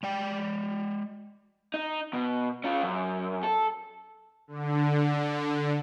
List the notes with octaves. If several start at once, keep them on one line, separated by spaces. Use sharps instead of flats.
G#3 D5 G5
D#4
B2
C#4 F4
F#2
A4
D3